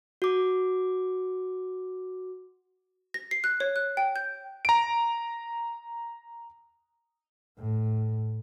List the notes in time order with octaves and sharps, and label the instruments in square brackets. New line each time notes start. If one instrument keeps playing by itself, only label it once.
[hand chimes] F#4 D6
[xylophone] A#6
C7
F#6
C#5
F#6
G5
G6
[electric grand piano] A#5 D7
[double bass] A2